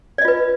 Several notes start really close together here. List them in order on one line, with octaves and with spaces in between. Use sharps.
D5 D#5 F4 B4